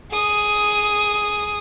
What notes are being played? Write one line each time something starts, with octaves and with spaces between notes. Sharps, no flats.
G#4 D#6